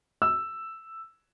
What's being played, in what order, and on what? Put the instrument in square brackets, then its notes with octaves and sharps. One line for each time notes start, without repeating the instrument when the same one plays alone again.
[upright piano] E6